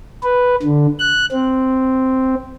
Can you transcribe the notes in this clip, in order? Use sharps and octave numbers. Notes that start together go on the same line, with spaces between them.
B4
D3
F#6
C4